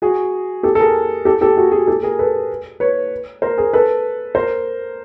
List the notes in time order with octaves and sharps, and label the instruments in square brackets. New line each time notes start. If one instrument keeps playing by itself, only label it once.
[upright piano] F#4 G#4
G4 A4
A4
G#4 A#4
G4 A4
G4 A4
F#4 G#4
F#4 G#4
G4 A4
G#4 A#4
A4 B4
B4 C#5
A#4 C5
G#4 A#4
A4 B4
A#4 C5